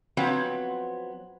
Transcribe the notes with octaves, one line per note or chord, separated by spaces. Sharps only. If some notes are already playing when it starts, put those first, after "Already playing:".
F3 F#3 B3 C4 C#5